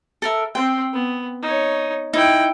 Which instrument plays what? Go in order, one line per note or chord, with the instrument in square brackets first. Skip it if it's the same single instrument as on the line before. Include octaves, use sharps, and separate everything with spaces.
[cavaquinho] A4 A#4 E5
[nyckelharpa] C4 C6 [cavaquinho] G5
[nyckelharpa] B3
D#4 C#5
[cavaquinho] D#4 [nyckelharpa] E4 G5